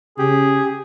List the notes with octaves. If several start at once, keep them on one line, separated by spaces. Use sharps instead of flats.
C#3 G4 G#4